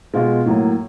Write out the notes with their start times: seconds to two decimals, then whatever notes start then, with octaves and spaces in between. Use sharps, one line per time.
0.14 B2 G#3 F4
0.46 A2 F#3 A#3